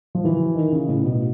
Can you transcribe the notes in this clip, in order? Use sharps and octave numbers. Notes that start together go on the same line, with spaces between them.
F3
E3
D#3
C#3
A2
B2